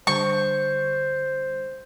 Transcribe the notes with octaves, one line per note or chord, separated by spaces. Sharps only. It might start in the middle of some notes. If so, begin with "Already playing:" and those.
D3 G3 C5 C#6